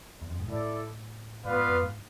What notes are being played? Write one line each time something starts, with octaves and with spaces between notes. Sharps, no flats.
E2
F2
G#2
A2 E4 A4 D5
G#2 B3 F4 B4 D5 F5
G#2
F2
G#2